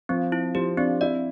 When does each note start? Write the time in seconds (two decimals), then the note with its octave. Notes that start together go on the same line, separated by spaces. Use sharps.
0.09 F3 C4
0.32 E4
0.55 F3 G4
0.77 C4 D4
1.01 E4 D5